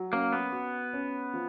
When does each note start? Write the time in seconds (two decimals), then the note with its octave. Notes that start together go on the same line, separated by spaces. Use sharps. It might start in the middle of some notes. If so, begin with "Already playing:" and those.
Already playing: F#3
0.12 A#3 C#4
0.33 B3
0.52 F#4
0.93 C#4
1.34 F3